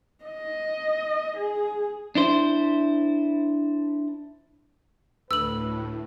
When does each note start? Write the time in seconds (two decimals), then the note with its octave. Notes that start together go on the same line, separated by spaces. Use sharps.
0.25 D#5
1.38 G#4
2.15 D4 E4 C5
5.31 D2 A2 B4 E6 F#7